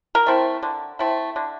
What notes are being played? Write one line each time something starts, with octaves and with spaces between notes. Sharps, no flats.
A#4
A3 C4 E4
D3
A3 C4 E4
D3